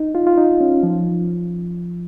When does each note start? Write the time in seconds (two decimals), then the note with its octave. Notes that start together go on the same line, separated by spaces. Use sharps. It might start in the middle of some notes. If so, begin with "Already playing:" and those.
Already playing: D#4
0.15 F4
0.27 F4
0.38 D#4
0.61 C#4
0.83 F3